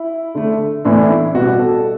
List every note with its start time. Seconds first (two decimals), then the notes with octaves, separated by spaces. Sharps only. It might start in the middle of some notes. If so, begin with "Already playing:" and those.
Already playing: E4
0.35 D3 A3
0.85 A2 E3 B3 D4
1.10 E4
1.34 B2 G3 B3 F#4
1.59 A4